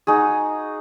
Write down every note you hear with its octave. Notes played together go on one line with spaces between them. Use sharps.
D#4 F#4 G#4